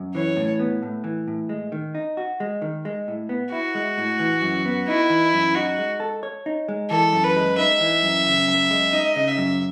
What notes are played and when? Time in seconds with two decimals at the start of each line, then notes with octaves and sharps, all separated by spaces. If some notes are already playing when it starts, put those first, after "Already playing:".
Already playing: F#2
0.15 E3 C#5
0.37 A2
0.59 B3
0.82 A2
1.04 E3
1.28 A2
1.49 G#3
1.72 D#3
1.95 D#4
2.17 F#4
2.40 G#3
2.62 D#3
2.85 G#3
3.08 A2
3.29 B3
3.52 E4 F#4
3.75 G#3
3.98 A2
4.19 E3
4.42 F#2
4.65 B3
4.88 D#4 E4
5.10 E3
5.33 F#2
5.55 D#4 F#4
5.78 G#3
6.00 A4
6.23 C#5
6.46 D#4
6.68 G#3
6.90 E3 A4
7.13 F#2
7.24 B4
7.36 G#3
7.58 D#4 E5
7.80 E3
8.03 F#2
8.26 C#3
8.48 F#2
8.71 G#3
8.93 D#4 D#5
9.16 C#3
9.28 E5
9.38 F#2